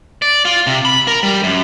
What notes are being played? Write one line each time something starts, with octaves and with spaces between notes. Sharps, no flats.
D5
F4
C3
B5
A#4
G3
F#2